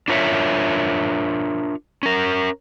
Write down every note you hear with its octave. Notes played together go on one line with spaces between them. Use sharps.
D4 F4 A#4 C5 C#5 E5
C#4 A#4